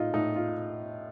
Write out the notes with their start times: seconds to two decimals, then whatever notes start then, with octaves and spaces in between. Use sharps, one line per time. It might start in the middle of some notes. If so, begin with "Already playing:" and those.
Already playing: A2 D#4 F4 D#5
0.14 A2 D#4
0.36 F4